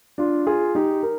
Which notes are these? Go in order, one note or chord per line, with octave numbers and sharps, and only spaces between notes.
D4 F4
F4 G#4
D#4 G4
A#4